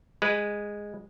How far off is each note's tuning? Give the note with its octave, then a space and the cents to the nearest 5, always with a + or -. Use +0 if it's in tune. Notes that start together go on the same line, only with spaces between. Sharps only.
G#3 -10 B4 +0